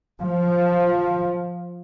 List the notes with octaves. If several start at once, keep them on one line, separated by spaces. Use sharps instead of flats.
F3